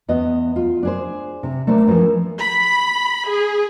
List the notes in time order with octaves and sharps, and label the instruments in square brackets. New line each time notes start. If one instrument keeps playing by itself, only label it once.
[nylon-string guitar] E2 B3 D#5
F4
D4 G#4 C5
C3
A3 A#3 D4 C5
E3 F3 C#4 A#4
[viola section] B5
G#4